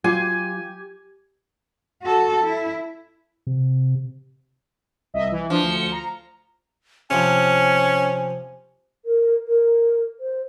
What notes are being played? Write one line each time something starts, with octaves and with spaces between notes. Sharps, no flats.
F#3 F4 G4 G#5
F#4 A4
E4
C3
C2 D#5 E5
E3
F3 D4
D2 C#7
A#5
C3 F3 C#4 G#5
A#4
A#4
C5